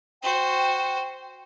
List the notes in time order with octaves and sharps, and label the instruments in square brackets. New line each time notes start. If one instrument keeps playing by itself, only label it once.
[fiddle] F#4 C5 [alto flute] G5